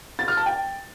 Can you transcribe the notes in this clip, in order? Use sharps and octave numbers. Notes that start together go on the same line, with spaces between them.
A6
F6
A5
G5